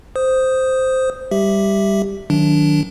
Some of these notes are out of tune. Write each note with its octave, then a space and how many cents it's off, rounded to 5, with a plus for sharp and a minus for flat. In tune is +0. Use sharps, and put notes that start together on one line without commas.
C5 -5 D#6 +0
G3 +10 G4 +0 E5 +0
D#3 +0 F#3 -5 D4 -15